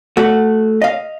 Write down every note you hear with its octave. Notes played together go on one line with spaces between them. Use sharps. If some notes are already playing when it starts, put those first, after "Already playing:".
A3 F#4
D#5 F5